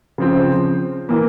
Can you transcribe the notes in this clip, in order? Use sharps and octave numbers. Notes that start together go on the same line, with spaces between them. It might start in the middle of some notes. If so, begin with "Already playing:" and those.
C#3 F3 C4
E3 A#3